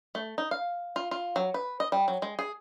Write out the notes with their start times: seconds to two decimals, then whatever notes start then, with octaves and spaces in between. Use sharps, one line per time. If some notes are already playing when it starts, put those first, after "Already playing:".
0.15 A3
0.38 D#4
0.51 F5
0.96 F4
1.11 F4
1.36 F#3
1.54 B4
1.80 D#5
1.92 G3
2.08 F#3
2.22 G#3
2.39 G#4